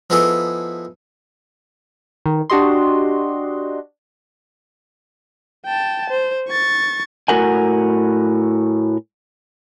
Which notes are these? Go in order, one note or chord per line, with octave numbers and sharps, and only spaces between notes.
F3 B3 D#4 E4 G#4 A4
D#3
D4 F#4 G4 D#5 C6
G5 A5
C5
C#6 A6
A2 F#4 A#4 F#5 G#5